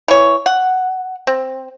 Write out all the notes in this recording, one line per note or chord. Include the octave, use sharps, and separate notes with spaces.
E3 C#5
F#5
C4